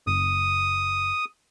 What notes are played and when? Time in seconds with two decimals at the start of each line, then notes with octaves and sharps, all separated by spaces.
0.07 F#1 D#6